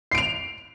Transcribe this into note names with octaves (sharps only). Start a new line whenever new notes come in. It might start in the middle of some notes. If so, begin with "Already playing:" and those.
C7 D7 F7